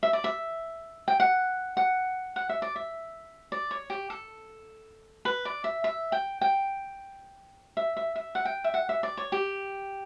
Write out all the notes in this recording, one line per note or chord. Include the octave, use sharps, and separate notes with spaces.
E5
D5
E5
G5
F#5
F#5
F#5
E5
D5
E5
D5
C#5
G4
A4
B4
D5
E5
E5
G5
G5
E5
E5
E5
F#5
G5
E5
F#5
E5
D5
C#5
G4